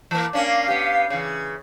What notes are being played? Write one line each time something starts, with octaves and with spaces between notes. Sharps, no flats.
E3 A#3
A#3 C#4 D4 F5
B3 G4
C#3 E3